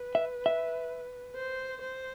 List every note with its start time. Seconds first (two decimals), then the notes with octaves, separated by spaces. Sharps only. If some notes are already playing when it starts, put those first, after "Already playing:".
Already playing: B4
0.15 E5
0.46 E5
1.36 C5
1.81 C5